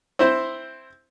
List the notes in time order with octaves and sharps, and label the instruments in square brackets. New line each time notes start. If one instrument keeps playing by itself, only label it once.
[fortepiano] C4 E4 C5